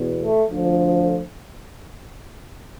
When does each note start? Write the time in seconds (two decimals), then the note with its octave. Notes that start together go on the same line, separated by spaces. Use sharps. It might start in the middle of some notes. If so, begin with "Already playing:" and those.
Already playing: E2 B2
0.21 A3
0.50 D2 D3 F3